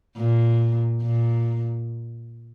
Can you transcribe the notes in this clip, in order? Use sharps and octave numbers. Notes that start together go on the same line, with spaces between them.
A#2
A#2